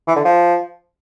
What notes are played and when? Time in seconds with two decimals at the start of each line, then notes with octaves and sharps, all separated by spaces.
0.07 E3
0.16 D3
0.24 F3